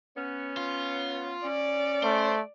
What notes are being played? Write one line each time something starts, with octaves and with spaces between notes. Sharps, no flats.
B3 C#4
F4
C#4 D5
A3 C5